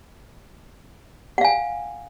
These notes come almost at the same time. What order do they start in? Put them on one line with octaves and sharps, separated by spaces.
F#5 F5 G#5